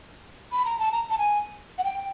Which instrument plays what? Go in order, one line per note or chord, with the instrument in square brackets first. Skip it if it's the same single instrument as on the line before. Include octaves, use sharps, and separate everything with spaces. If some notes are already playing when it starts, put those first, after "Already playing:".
[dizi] B5
A#5
A5
A#5
A5
G#5
F#5
G5